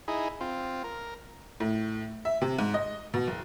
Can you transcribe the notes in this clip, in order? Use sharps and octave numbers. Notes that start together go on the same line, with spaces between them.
D#4 E4 G#4
C4 F4
A#4
A2
E5
C3
G#2
D#5
B2
F#1